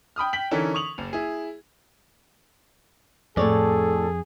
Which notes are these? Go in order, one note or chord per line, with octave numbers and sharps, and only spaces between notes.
G5 B5 D#6 F6
G5 B6 F#7
D3 E3 C#4 D#4 A4 A#4
C#6 D#6 F7 F#7
F#1
E4 G#4
F2 A2 G#4 A4 C#5 D5